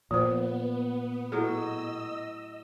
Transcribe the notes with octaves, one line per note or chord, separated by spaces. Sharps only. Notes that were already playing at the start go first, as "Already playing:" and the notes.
A#2 F3 B3 C5
A2 F#3 G4 G#4 D#5 E6